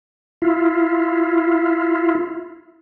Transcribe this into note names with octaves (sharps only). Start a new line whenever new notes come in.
E4 F4